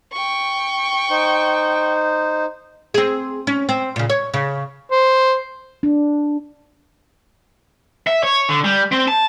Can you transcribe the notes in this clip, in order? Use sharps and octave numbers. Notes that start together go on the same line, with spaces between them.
G5 C#6
D#4 C5
C4 G#4
C#4
C4
A#2 C#3
C#5
C#3
C5
D4
E5
C#5
D3
G3
C4
A5